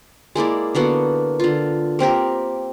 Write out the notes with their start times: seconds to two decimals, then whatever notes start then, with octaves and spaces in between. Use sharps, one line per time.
0.35 G#3 A#3 E4 D5
0.75 D3 A#3 B3 F#4
1.40 D3 F4
1.99 A#3 C4 G4 A#4